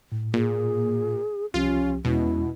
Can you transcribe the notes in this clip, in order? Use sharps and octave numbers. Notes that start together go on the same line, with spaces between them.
A2
A#2 G#4
C2 F3 C#4 F4 G4
E2 B2 G#3 C#4 E4